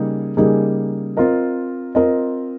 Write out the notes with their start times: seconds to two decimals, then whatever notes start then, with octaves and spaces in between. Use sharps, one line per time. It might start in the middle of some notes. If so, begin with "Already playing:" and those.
Already playing: C#3 G3 A#3 D#4 G#4
0.37 C#3 G3 A#3 D#4 G#4
1.17 C4 F4 A#4 D#5
1.95 C4 F4 A#4 D#5